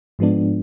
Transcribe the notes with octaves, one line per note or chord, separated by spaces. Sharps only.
G#2 F3 G#3 B3 D4